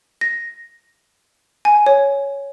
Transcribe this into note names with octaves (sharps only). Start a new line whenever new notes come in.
A#6
G#5
C#5